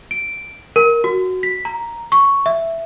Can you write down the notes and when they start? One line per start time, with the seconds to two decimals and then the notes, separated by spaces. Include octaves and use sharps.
0.11 D7
0.76 A#4
1.04 F#4
1.43 B6
1.65 A#5
2.12 C#6
2.46 E5